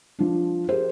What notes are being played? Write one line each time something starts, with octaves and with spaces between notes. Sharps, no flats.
F3 D4
G4 G#4 A#4 C5